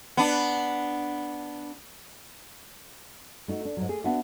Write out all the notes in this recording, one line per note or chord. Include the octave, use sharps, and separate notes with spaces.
B3 D4
A3 D#4 F#4
D4
G#2 F#3
A3 G#4
B3 D4 F#4 E5 F#5